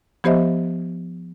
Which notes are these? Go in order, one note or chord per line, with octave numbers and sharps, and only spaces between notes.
F3 B3 G4 C5 D#5 E5